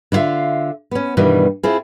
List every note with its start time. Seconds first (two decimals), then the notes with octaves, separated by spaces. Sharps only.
0.12 D3 E4 F4 E5 F5
0.91 B3 C#4
1.17 G2 B2 D#3 E3 G3
1.63 C4 E4 F4 G#4